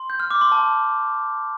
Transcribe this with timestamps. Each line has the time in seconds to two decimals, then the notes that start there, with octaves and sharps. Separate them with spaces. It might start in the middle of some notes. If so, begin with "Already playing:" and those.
Already playing: C6
0.10 G6
0.20 F6
0.31 D6
0.41 C6
0.52 A5